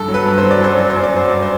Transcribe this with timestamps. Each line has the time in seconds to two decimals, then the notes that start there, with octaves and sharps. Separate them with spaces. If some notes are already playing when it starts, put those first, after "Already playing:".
Already playing: G2 A4
0.08 F#3
0.14 B4
0.26 G2
0.38 C5
0.43 F#3
0.51 D5
0.61 F#2 C5
0.77 F#3 D5
0.90 C5
0.96 F#2
1.03 D5
1.14 F#3 C5
1.30 G2 D5
1.42 C5